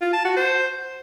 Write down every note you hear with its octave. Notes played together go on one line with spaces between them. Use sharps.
F4
A5
F#4
C5